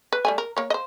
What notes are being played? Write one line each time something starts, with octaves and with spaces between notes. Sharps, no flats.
B4
G3 A3 G#5
A#4
A#3 C#5
C5 D#5